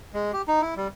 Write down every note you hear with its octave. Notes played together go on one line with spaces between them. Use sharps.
G#3
G4
D#4
E4
G3